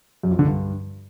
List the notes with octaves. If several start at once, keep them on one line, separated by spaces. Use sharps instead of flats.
F#2
F2
D3
G2